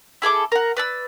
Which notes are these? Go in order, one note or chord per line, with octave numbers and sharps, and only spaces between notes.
E4 G#4 A4 D6
A#4 F#5
B4 D5 E6